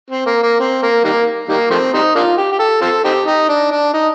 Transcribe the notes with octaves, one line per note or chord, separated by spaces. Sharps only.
C4
A#3
A#3
C4
A#3
D#3 G3 A#3
D#3 G3 A#3
F3 A3 C4
G3 C4 D#4
A#3 D4 F4
G4
G4
A4
C4 F4 A4
C4 D#4 G4
D#4
D4
D4
D#4